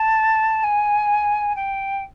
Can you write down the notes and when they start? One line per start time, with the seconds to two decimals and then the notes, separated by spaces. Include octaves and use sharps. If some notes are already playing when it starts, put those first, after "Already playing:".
Already playing: A5
0.63 G#5
1.55 G5